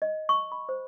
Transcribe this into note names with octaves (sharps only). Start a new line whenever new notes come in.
D#5
C#6
B5
C5